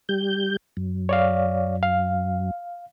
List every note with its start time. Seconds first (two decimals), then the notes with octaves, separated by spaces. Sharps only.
0.09 G3 G6
0.77 F#2
1.09 C#5 D5 F5
1.83 F5